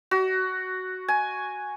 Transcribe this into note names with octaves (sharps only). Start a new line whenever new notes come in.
F#4
G#5